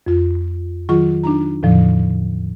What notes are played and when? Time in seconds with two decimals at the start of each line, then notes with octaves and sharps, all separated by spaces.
0.06 F2 F4
0.89 D#3 F#3 F4 G#4 C#6
1.23 D4 D#4 A#5
1.63 E2 A2 D3 F3